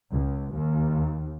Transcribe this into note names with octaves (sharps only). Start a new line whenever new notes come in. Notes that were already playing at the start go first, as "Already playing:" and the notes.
C#2
D#2